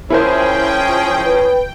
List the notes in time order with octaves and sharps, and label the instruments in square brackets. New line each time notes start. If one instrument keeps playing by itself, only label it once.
[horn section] F3 C#4 G#4 [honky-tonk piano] E4 A#4 C5 [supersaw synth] G5
[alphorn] B4